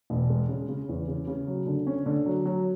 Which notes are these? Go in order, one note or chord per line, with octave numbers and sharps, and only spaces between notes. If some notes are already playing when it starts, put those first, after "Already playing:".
E1
G#3
C#3
C#3
E2
C#3
C#3
F#3
D3
C#4
D3
F#3
F#3